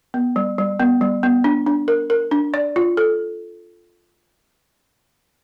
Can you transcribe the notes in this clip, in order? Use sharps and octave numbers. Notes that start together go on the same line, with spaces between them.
B3
G3
G3
B3
G3
B3
D4
D4
A#4
A#4
D4
D5
F4
A4